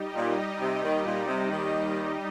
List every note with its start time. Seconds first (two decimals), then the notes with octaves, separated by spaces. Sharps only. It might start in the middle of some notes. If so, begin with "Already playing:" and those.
Already playing: G3 D#4 G4 D#5
0.15 A#2
0.60 C3
0.82 D#2 D#3
1.05 A#2
1.27 C3
1.50 D#2 D#3